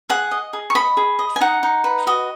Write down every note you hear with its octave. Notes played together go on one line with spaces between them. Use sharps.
G#4 F#5
D#5
G#4
C#6
D#5 B5
G#4
D#5
G#5
D#4 F#5
D#4
B4
F#4 D#5